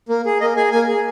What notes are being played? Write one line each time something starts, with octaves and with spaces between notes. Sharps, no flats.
A#3
G#4
A#3 D#5
G#4 G#5
A#3 G#5
G#4